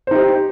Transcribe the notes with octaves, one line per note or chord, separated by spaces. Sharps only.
D#4 G4 C5